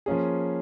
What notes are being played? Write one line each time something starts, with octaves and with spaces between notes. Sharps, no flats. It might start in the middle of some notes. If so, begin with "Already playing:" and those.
F3 A#3 C#4 G#4